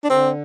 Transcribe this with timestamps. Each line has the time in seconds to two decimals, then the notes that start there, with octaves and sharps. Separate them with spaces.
0.04 D4
0.10 D3 C4